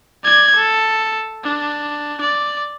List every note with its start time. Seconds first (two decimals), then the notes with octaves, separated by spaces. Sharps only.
0.24 D5 G#6
0.56 A4
1.44 D4
2.22 D5